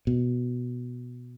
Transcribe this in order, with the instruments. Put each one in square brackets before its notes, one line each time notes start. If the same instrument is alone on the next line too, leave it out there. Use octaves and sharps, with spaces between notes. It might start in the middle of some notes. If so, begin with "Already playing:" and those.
[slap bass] B2